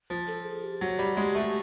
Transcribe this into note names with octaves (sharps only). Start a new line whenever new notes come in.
F3
A4
G#4
G4
F#3
G3
G#3
A3